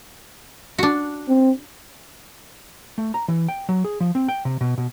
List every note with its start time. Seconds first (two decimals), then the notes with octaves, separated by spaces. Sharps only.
0.78 D4 F#4
1.28 C4
2.98 A3
3.14 A#5
3.28 E3
3.48 G5
3.69 F#3
3.85 G#4
4.00 F3
4.15 C4
4.28 G5
4.45 C3
4.61 B2
4.78 B2